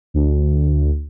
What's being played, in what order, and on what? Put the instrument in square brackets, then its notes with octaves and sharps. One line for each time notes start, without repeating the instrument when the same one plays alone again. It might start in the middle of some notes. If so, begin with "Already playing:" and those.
[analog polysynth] D2